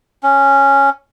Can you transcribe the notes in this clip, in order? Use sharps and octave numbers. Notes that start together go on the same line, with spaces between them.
C#4